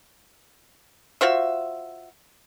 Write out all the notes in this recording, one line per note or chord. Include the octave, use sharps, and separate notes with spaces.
F4 F#4 C5 E5